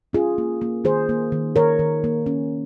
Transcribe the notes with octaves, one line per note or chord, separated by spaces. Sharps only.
C#4 F4 G#4
A#3
A#3
D#3 G#4 C5
A#3
D#3
D#3 A#4 C#5
D#3
A#3
C#4